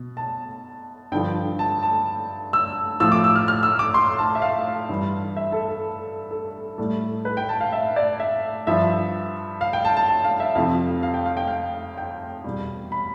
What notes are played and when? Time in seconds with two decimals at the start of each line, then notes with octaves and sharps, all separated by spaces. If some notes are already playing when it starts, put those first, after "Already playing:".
Already playing: B2
0.17 A5
1.12 G2 D3 F3 G5
1.59 A5
1.83 A5
2.53 E6
3.00 A2 F3 E6
3.12 D6
3.24 E6
3.36 F6
3.48 F6
3.63 E6
3.79 D6
3.94 C6
4.19 A5
4.35 E5
4.42 F5
4.89 G2 E3 G3
5.37 E5
5.52 A4
5.68 A4
6.31 A4
6.78 A2 G3 A4
7.25 B4
7.37 G5
7.49 A5
7.61 F5
7.72 E5
7.96 D5
8.20 E5
8.67 G2 F3 E5
9.61 F5
9.73 G5
9.85 A5
9.97 A5
10.08 A5
10.24 F5
10.40 E5
10.55 F2 C3 F3 F5
11.03 F5
11.14 G5
11.26 F5
11.37 G5
11.47 F5
11.98 G5
12.44 E2 B2 G3
12.92 B5